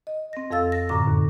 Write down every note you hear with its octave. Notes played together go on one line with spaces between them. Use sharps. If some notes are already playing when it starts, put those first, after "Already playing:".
D#5
C4 A#6
F2 A4 F5 E6 A6
A#6
F#2 A2 D3 A#5 D6 A#6
D#2